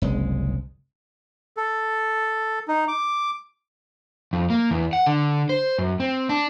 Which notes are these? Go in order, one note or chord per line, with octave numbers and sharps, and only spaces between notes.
F#1 C2 G#3
A4
D#4
D6
F2
A#3
E2
F#5
D3
C5
F#2
C4
D4